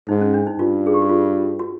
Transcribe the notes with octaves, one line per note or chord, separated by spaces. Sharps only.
G#2 D#4
C#4
D4
D#4
G2 F4
G#4
G4
F#4
F4
F#4